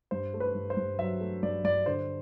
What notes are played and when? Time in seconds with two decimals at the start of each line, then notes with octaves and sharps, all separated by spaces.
0.11 G2 C5
0.34 A3
0.40 B4
0.55 G2
0.70 C5
0.77 G2
0.99 F#3 E5
1.20 A3
1.43 G2 D5
1.64 G2 D5
1.86 D3 C5